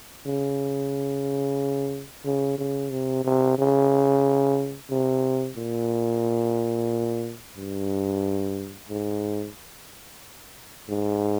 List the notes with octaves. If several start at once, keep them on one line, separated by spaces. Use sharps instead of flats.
C#3
C#3
C#3
C3
C3
C#3
C3
A#2
G2
G#2
G#2